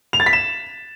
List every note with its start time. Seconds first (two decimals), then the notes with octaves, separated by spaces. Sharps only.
0.13 F7
0.20 A6
0.26 B6
0.33 E7